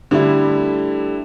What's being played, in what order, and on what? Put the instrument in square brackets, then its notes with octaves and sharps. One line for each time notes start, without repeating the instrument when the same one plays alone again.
[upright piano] D3 G3 A3 E4